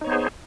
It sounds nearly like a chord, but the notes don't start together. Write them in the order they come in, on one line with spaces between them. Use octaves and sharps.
D#4 C#5 B3 C5 G#4